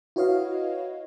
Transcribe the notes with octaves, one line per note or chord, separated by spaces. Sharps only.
E4 F#4 B4 C#5 D#5 F5